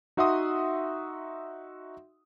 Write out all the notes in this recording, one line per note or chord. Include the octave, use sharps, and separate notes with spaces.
D#4 F#4 E5 F#5 C6 D#6